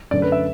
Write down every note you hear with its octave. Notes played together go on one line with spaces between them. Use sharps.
F#2 D3 A3 D5
B4
E5